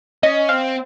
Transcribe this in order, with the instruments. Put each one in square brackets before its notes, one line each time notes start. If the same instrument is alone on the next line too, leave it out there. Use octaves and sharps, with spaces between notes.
[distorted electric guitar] C#4 [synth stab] D#5
[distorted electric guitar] C4 [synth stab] F5